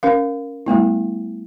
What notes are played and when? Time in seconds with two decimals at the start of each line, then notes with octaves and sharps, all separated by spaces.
0.03 C#4 A#4 F5
0.66 G3 A3 B3 E4